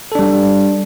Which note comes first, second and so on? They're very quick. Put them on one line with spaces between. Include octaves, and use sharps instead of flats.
A4 D4 G3